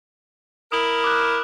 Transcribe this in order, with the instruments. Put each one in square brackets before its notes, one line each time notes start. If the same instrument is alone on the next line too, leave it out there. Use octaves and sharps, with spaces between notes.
[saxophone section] E4 A#4 [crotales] D#6 F#7
[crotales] D6 F#6